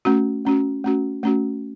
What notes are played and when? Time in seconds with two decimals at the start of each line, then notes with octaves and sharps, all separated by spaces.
0.05 A3 C#4 F#4
0.45 A3 C#4 F#4
0.84 A3 C#4 F#4
1.23 A3 C#4 F#4